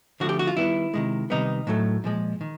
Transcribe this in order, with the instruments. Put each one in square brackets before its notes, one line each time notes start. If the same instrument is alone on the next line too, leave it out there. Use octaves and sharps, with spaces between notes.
[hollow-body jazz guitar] D3 F3 A3 F#4
G4
F#4
F4
D#3 G3 B3 E4
C3 D#3 G#3
C3 D#3 G3 B3 D#4
A2 F#3 A3
A#2 F3 G#3
D#3